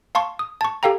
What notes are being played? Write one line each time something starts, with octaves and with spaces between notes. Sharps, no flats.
F5 A5 C6 C#6
D#6
A5 C#6
G4 A4 F5 G5 A#5